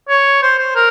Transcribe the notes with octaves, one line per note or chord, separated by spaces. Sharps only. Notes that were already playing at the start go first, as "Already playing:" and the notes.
C#5
C5
C5
A#4